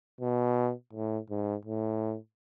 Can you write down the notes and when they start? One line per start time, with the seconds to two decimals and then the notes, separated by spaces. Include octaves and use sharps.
0.21 B2
0.93 A2
1.30 G#2
1.65 A2